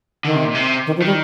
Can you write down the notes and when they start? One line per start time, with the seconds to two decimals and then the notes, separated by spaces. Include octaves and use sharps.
0.25 D3 D#3
0.35 C3
0.45 A#2
0.55 C3
0.86 D#3
0.97 F3
1.02 D#3 G3